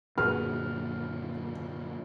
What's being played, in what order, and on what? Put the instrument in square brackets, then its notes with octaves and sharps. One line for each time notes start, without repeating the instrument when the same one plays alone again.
[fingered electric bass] F#2 A#2 D3 [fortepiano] F#4 G#4 B4 [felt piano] F6